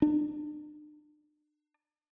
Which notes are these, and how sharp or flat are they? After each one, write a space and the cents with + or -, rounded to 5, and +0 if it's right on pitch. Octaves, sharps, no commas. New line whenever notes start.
D4 +40